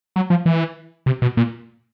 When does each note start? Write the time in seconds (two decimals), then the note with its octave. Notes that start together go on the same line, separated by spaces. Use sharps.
0.16 F#3
0.30 F3
0.46 E3
1.06 C3
1.22 B2
1.37 A#2